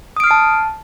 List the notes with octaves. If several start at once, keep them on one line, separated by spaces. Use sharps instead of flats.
A5 D#6 F6 C7 D7